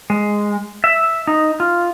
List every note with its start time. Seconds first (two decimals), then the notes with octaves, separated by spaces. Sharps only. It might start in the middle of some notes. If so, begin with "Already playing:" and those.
0.10 G#3
0.84 E5
1.27 D#4
1.60 F4